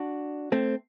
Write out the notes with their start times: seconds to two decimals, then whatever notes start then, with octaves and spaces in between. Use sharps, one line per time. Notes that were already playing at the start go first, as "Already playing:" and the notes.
Already playing: D4 F#4
0.52 A3 C4